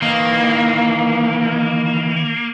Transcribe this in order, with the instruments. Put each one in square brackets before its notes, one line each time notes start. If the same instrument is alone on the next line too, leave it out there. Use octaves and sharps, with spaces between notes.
[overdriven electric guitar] D#3 E3 [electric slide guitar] A#3